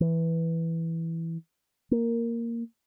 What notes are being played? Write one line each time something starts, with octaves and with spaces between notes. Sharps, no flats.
E3
A#3